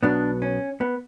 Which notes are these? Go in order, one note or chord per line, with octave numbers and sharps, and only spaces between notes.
B1 B2 F#3 B3 D4
C#4
B3